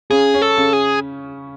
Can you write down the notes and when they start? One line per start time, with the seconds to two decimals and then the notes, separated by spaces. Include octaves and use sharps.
0.11 C#3 G#4
0.34 C#4
0.42 A4
0.57 C#3
0.73 G#4